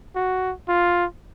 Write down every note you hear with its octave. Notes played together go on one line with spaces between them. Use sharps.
F#4
F4